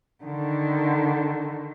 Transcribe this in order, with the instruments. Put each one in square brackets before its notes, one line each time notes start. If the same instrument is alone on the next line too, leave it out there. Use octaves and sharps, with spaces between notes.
[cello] D3 D#3